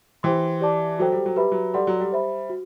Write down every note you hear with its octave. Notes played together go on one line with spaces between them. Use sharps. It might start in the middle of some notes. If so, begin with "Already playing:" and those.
E3 G4 C5 G5 C6
G4 D5 A5 D6
F#3 F#4 A4 C5 G5
G3
F#3
G3 G4 B4 E5 B5
F#3
G3 A4 D5 F#5 C6
F#3
G3
C5 E5 B5
F#4